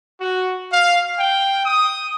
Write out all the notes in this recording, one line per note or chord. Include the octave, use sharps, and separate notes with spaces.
F#4
F5
G5
D#6